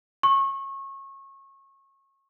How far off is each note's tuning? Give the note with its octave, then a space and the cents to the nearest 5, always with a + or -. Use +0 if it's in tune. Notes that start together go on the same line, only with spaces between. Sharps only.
C#6 -25